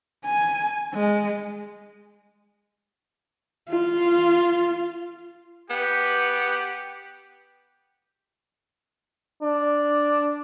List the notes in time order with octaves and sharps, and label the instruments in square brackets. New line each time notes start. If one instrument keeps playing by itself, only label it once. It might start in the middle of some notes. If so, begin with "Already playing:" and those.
[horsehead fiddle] G#5
G#3
F4
[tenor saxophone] B3 [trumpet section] G4
[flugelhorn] D4